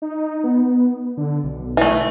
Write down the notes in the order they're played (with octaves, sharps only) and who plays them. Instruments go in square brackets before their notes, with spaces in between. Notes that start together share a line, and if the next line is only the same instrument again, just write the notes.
[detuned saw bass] D#4
B3
D3
B1
[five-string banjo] E3 A3